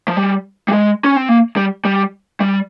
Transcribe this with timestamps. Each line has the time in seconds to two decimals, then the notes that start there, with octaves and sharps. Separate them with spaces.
0.08 F3
0.17 G3
0.68 G3
0.72 G#3
1.04 C#4
1.16 C4
1.29 A#3
1.56 G3
1.85 G3
2.41 G3